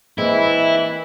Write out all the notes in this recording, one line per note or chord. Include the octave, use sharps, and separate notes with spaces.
E3 G#3 A#3 C4 E4